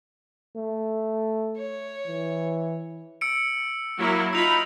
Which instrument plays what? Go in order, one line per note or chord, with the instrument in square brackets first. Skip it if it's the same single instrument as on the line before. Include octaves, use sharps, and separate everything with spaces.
[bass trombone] A3
[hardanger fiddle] C#5
[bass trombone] E3
[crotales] E6 C#7 D7
[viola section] F#3 A#3 E4
[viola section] D#4 F4 B5 [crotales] E6 F7